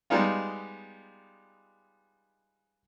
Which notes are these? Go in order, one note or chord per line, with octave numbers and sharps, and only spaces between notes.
G3 G#3 B3 D#4 F4